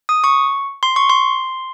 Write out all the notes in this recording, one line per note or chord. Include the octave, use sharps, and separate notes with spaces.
D#6
C#6
C6
C#6
C6